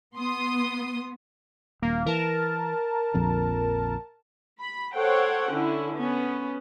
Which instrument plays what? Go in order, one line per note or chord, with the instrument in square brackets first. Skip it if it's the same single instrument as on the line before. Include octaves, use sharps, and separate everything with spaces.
[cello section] B3 [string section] C6 D#6
[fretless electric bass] D#1 [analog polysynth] A#3
[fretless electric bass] E3 [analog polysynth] A#4 A5
[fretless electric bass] A#1 F2 D3
[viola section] B5
A4 C5 C#5 F#5 G5
D3 C#4 E4
B3 C#4